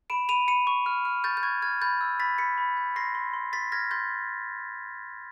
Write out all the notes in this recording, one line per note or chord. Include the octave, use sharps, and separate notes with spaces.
B5 D7 E7
B5 D#7 F7
B5 C#7 D#7
C#6
F6
F6
C#6 G6 A6
G6
C#6 G#6
F6 G#6
B5 G6 A6
E6
B5 A6 B6
B5 B6 C#7
B5
G6
C6 A#6 C7
C6
C6
C6 A6 B6
F6 G#6 A#6
C6 G6 A6